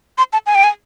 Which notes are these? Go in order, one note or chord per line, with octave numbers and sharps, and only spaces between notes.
C6
A5
G#5
G5
G#5